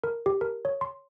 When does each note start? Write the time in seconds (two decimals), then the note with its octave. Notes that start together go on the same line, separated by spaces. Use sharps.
0.04 A#4
0.26 G4
0.41 A#4
0.65 C#5
0.81 C6